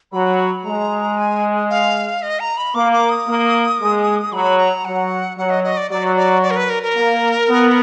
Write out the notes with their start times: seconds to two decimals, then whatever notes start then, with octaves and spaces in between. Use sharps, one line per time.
0.12 F#3 B5
0.65 G#3 A#5
1.18 G#5
1.70 F5
2.22 D#5
2.40 A#5
2.57 B5
2.75 A#3 D6
2.93 D6
3.10 D#6
3.27 A#3
3.80 G#3
4.32 F#3 B5
4.58 A#5
4.85 F#3 F#5
5.38 F#3 F#5
5.50 D#5
5.64 D#5
5.77 D5
5.90 F#3 D5
6.16 D5
6.42 D5
6.51 A#4
6.56 B4
6.70 A#4
6.83 A#4
6.96 A#3
7.48 B3